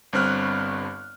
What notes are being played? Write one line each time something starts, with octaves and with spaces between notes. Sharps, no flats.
G1 G2 C4 F6 F#6